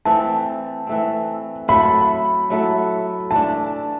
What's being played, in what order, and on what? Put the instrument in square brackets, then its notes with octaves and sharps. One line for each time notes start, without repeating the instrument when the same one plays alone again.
[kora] E3 A3 C4 [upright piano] A5
[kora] E3 A3 C4
[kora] F#3 A3 E4 A4 [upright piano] B5
[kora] F#3 A3 E4 A4
[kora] E3 A3 D4 [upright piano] A5